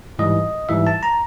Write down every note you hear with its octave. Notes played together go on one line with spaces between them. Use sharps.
G#2 E3 G3 D#5
G#2 E3 G3 E5
A5
A#5